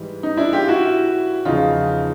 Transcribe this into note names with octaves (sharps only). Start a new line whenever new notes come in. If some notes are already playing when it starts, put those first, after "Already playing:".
Already playing: G#2 E3 G3
D#4
D4 E4
F4 G4
E4 F#4
E2 C#3 F3 D#4 F4